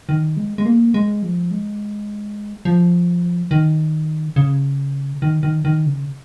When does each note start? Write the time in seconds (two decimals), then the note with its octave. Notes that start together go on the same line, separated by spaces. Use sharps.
0.09 D#3
0.37 G#3
0.58 G#3
0.66 A#3
0.94 G#3
1.22 F3
1.51 G#3
2.65 F3
3.51 D#3
4.36 C#3
5.22 D#3
5.43 D#3
5.65 D#3
5.86 C#3